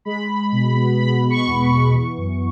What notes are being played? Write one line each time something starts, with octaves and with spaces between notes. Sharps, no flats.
G#3 B5
G#3
B2
B3
G#3 B5
B2
C#6
E2
B5
B3
E3 C#6
F#2